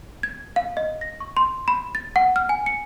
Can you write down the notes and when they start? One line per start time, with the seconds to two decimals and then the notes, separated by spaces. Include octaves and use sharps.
0.23 G#6
0.56 F5
0.77 D#5
1.01 A#6
1.20 C#6
1.37 C6
1.68 B5
1.95 A6
2.16 F#5
2.36 F6
2.49 G#5
2.66 C#7